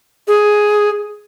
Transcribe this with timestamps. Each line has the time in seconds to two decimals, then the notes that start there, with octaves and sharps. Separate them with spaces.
0.28 G#4